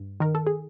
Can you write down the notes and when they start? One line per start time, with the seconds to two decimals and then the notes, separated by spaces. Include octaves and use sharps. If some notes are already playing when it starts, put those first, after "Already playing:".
Already playing: G2
0.20 D#3 A#4
0.35 A4
0.47 G#4